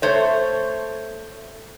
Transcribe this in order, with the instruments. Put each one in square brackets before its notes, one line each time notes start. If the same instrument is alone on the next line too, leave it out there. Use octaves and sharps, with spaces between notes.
[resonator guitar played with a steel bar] A3 C5 C#5